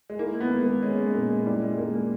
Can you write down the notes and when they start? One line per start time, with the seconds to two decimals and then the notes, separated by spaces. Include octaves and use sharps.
0.10 G#3
0.19 A#3 E4
0.41 B3
0.51 G#3
0.61 A#3
0.83 G#3 C#4
0.98 G#3
1.14 A#2 A#3
1.29 G#3
1.46 G3 E4
1.61 G#3
1.77 G#3 A#3
1.93 A#3